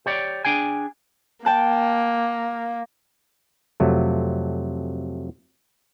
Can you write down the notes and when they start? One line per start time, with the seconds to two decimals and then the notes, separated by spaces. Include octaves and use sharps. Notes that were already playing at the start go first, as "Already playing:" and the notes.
0.06 G4 C#5 D5
0.45 D4 G#4 G5 G#5
1.45 A#3 G5 A5 F#6
3.80 F2 C3 F#3 A3